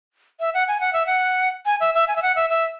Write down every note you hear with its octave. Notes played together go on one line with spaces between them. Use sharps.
E5
F#5
G#5
F#5
E5
F#5
G#5
E5
E5
G#5
E5
F#5
E5
E5